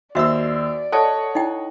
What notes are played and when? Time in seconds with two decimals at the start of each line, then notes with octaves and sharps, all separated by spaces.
0.15 D#2 F#4 C5 D5 E5 E6
0.92 A4 C#5 D#5 F#5 A5
1.35 D#4 E4 G5